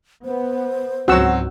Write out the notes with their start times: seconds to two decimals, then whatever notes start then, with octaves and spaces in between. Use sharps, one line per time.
0.24 B3 C5
1.08 C#2 G#2 F#3 C4 F#4 F#5 E6